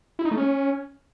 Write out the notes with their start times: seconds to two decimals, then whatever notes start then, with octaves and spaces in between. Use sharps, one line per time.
0.19 E4
0.25 D#4
0.31 A3
0.37 C#4